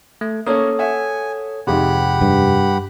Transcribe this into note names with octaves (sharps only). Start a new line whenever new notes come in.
A3
A#3 C#4 A4 C#5 D#6
E5 F#5 G#5
F2 G#2 C3 D#3 G#3 G4 F#5 B5
G2